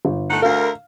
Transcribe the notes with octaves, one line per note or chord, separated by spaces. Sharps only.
G1
A3 D#4 F#5
D2 A#4 F5